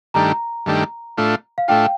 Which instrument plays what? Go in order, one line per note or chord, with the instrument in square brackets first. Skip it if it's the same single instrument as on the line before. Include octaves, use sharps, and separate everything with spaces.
[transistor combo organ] G2 D#3 A3 D4 G4 [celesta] A#5
[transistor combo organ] G2 D#3 A3 D4 G4
A2 A3 D4 F4
[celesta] F5
[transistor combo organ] A2 A3 D4 F4 [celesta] G5